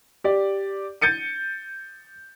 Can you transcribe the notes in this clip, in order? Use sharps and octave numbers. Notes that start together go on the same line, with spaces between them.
G4 D5
G6 A6 C#7 D#7